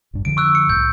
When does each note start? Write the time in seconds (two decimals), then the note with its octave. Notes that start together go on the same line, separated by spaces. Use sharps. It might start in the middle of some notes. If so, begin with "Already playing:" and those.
0.13 G1 G2
0.25 F2 D3 F3 D7
0.37 C#6 E6 F#6
0.55 C#7
0.70 C2 A2 G6